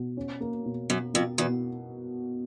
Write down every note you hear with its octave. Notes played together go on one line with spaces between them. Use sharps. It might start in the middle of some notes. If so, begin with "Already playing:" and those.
Already playing: B2
C#4
A#3
B2
F#2 B2
F2 B2
E2 B2